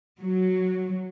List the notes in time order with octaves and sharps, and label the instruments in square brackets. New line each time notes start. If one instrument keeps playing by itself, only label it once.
[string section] F#3